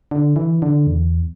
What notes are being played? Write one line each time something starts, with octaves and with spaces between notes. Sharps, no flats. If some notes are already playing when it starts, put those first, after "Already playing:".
D3
E3
D3
E2